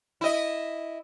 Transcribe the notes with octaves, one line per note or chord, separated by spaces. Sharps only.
E4 D#5